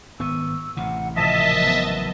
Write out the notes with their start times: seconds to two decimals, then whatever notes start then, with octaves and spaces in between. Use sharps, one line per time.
0.20 G#1 B3 C#6 E6 D#7
0.77 A1 C3 F#5
1.16 A#2 C#3 F3 D#5 E5 A5 B6
1.59 F#3 B3